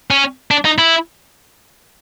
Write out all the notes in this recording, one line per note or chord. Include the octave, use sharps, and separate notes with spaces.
C#4
D4
D#4
E4